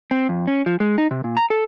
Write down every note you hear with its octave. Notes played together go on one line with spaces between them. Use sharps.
C4
F2
C#4
F3
G#3
D#4
C3
A#2
A#5
A4